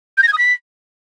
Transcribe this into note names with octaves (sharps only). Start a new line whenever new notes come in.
G6
A#6
G#6
D#6
B6